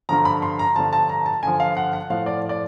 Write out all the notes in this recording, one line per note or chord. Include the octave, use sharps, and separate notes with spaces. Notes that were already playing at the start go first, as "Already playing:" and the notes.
G2 D3 F3 A#5
B5
C6
A#5
G2 D3 F3 A5
A5
A#5
A5
G2 D3 F3 G#5
F5
F#5
F#5
A2 F3 F5
D5
D5